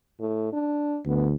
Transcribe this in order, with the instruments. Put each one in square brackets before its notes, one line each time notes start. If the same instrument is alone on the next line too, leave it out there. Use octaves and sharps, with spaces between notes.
[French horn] A2
D4
[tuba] D2 [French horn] B3